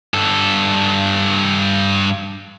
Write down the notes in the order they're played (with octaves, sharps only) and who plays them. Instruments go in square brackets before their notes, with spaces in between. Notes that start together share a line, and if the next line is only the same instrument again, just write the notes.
[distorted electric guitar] G2 A4